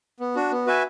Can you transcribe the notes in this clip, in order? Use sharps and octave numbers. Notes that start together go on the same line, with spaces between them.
B3
D4 F#4
B3
F#4 B4 E5 G#5